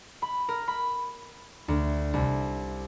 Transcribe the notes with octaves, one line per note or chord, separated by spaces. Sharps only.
B5
A#4
B5
D2
C2